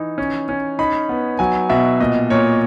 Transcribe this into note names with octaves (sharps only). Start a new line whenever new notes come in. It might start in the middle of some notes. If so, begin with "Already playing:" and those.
Already playing: E3 D#4
C#4
C#4
D#4 B5
B3
F#3 G#5
B2 E5
A#2 D#5
A#2 C#5